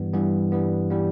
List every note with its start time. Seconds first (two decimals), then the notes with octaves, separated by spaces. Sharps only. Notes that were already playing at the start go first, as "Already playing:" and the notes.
Already playing: G2 E3 G3 B3
0.13 G2 E3 G3 B3
0.52 G2 E3 G3 B3
0.90 E3 G3 B3